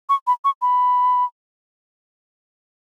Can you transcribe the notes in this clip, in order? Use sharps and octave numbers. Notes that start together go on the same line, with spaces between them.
C#6
B5
C#6
B5